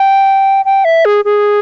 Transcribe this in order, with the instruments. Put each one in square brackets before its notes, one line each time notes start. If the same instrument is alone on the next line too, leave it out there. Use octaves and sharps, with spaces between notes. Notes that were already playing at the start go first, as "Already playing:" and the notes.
Already playing: [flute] G5
G5
E5
G#4
G#4